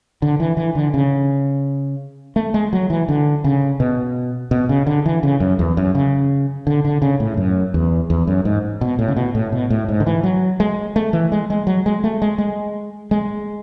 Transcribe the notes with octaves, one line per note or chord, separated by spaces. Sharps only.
D3
E3
E3
D3
C#3
A3
G#3
F#3
E3
D3
C#3
B2
B2
C#3
D3
E3
C#3
F#2
E2
F#2
C#3
D3
D3
C#3
A2
F#2
E2
E2
F#2
G#2
B2
A2
C#3
B2
A2
B2
A2
G#2
D3
E3
F#3
G#3
A3
E3
G#3
G#3
F#3
G#3
A3
G#3
G#3
G#3